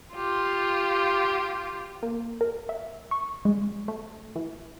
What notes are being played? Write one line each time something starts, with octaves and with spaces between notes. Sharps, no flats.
F4 G4
A#3
A#4
E5
C#6
G#3
A3
E3